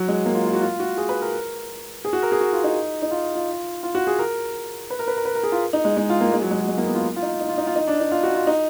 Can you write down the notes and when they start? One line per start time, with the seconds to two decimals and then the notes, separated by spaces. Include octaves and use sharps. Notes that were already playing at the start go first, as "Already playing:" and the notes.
Already playing: F#3
0.08 G#3
0.26 A#3
0.35 F4
0.46 F4
0.53 F#4
0.62 F4
0.80 F#4
0.97 G#4
1.09 B4
1.22 A#4
2.05 G#4
2.13 F#4
2.23 A#4
2.32 G#4
2.41 F#4
2.53 F4
2.64 D#4
3.02 D#4
3.11 F4
3.35 F4
3.83 F4
3.95 F#4
4.07 G#4
4.19 A#4
4.90 B4
4.99 A#4
5.08 B4
5.17 A#4
5.25 B4
5.35 A#4
5.43 G#4
5.52 F4
5.73 D#4
5.85 G#3
5.97 G#3
6.10 F4
6.21 A#3
6.32 G#3
6.42 F#3
6.51 G#3
6.60 F#3
6.68 G#3
6.78 A#3
6.87 B3
6.95 F4
7.16 F4
7.22 D#4
7.40 D#4
7.49 F4
7.58 D#4
7.67 F4
7.75 D#4
7.88 D4
8.00 D#4
8.12 F4
8.23 F#4
8.35 F4
8.47 D#4